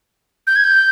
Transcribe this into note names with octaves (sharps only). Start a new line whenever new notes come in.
G6
G#6
G6